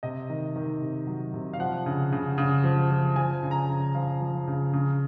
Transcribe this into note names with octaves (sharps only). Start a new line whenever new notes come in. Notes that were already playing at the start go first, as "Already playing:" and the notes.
C3 D#5
D#3
D#3
C3
F#3
C3
F5
F3 F#5
C#3
C#3
C#3
F3
F3
F3 G#5
C#3
A#5
G#5
C#3
F3 F5
F3
C#3
C#3